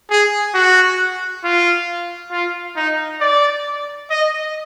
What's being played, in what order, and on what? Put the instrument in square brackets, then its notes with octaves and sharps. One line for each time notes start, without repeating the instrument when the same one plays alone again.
[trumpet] G#4
F#4
F4
F4
D#4
D5
D#5